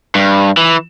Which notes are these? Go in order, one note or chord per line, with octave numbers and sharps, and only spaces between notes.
G2
E3